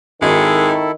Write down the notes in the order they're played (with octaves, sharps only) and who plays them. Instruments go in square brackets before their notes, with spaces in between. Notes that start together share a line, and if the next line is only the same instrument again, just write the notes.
[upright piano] G#1 [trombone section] D#3 [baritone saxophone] G#3 [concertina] E4 A4